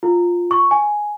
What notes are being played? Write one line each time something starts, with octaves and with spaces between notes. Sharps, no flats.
F4
C#6
G#5